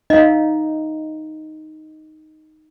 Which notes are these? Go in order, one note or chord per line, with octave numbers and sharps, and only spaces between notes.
D#4 D#5 F5